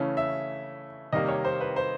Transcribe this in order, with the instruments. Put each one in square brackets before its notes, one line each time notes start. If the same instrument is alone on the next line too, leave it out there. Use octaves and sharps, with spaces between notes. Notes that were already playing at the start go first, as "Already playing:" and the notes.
Already playing: [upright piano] C#3 E3 A3 C#4
E5
C3 D#3 G3 A#3 D#5
C#5
C5
B4
C5